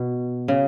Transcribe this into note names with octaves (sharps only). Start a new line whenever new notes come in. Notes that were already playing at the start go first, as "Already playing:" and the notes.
Already playing: B2
C#3